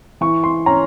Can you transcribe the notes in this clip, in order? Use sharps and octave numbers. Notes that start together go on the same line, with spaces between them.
E3 C#6
C6
C#4 A#5